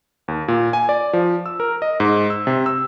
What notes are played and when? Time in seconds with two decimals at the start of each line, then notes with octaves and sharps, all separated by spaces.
0.28 D#2
0.48 A#2
0.73 G#5
0.89 D5
1.13 F3
1.46 E6
1.60 A#4
1.82 D#5
2.00 G#2
2.30 E6
2.47 C3
2.66 E6